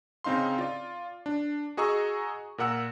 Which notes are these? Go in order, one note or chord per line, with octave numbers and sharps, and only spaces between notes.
C#3 C4 D#4 F5 C6
F4 D5
D4
F#4 G#4 D#5 A#5 C#6 E6
A#2 A#4 F#5 E6